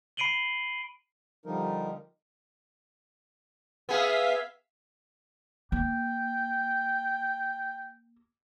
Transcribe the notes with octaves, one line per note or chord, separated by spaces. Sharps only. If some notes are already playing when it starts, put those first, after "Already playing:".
B5 C7 D7 D#7 F#7 G7
D3 F3 G3 D#4 A#4
B3 G#4 E5 F5 B6
A#3 G5